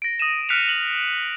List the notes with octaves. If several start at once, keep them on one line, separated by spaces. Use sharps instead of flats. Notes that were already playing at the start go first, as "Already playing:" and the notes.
A#6 D7
D#6 A#6 D#7 E7
F6 F#6 B6 C#7 D7 F7
F#7